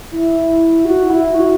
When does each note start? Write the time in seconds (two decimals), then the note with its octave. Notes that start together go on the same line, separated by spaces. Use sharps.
0.12 E4
0.85 F#4
1.10 E4
1.34 F#4